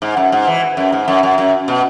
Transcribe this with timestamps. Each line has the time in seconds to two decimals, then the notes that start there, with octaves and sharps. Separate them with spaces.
0.02 G#2
0.17 F#2
0.32 G#2
0.47 E3
0.77 F#2
0.92 G#2
1.08 F#2
1.23 F#2
1.38 F#2
1.68 B2